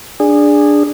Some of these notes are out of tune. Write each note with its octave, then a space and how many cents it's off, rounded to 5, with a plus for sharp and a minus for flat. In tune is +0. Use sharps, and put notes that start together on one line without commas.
D4 +0 G#4 -15